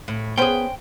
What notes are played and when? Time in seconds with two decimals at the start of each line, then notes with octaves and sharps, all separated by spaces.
0.08 A2
0.38 B3 C#4 G#4 C5 G5